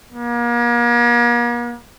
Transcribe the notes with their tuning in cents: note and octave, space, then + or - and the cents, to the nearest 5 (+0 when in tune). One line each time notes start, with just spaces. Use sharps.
A#3 +40